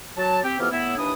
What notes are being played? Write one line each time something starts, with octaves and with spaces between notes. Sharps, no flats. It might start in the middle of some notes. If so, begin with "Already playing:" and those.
F#3 A5
C4 G4
F2 E3 B3 G4 E6 F6
A2 B3 E4
D#2 E3 D4 E4 D#6